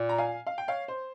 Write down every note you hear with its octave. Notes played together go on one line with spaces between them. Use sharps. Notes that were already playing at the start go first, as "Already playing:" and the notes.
Already playing: A#2
A#5
F5 G#5
F5
G5
C#5 F5
C5